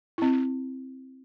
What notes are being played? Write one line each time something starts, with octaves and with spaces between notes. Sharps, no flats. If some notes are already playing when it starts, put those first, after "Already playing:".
C4 E4